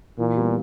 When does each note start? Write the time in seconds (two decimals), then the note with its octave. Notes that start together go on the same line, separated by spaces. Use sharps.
0.18 A#2 E3
0.36 G3 B3